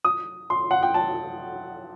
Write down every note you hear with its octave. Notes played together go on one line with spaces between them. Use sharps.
D#6
C6
F#5
G5
A5